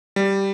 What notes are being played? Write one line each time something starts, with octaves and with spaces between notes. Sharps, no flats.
G3